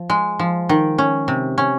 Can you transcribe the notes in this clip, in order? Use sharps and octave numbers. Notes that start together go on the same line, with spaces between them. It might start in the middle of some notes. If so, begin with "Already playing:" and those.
Already playing: F3
G#3
F3
D#3
C#4
C3
C#4